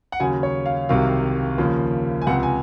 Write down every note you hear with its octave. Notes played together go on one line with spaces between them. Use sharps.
F#5
D#2 C#3 F#3 G#5
C#5
F5
C2 C3 D#3 F#3 F5
D#2 C#3 F3 A#3
G#5
C#2 C3 F3 F#5
G#5